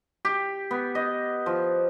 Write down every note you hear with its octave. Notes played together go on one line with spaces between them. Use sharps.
G4
B3
D#5
F3